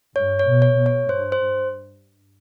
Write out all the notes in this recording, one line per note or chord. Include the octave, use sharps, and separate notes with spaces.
G2 C#5
C#5
B2
C#5
B2
C#5
G2 C5
C5